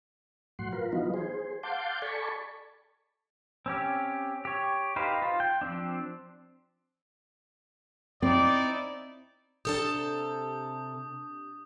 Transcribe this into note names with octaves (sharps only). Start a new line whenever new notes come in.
A2 F#3 F#5 C6
F4 A#4 B4
E3 F#3 B3 D#4 F4
G#4 C5
F5 F#5 A5 C6 D6 G6
A4 D5 G#5 A5 B5 C#6
C4 C#4 G4
G4 C#5
D#4 G4 B4 C5 F5
F4
G5
F3 C4 D4
C4 D#4 E4 D5
C3 D4 G4 A4 A5 D#6 G6